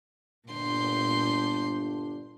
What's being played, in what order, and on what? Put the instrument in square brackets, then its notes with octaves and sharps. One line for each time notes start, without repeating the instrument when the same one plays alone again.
[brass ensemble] G1 D4 [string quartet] A#2 C6 G6